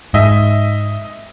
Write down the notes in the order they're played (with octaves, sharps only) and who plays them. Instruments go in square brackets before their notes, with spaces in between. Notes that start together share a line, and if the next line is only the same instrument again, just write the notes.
[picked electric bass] G#2 [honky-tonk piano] D#5 E5